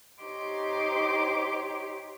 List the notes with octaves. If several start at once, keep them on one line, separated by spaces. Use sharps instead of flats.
D#4 G4 C5 C#5 C6 D6